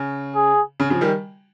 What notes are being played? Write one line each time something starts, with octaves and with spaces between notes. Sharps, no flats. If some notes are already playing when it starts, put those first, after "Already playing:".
Already playing: C#3
G#4
C#3
C#3 F3
D#3 G3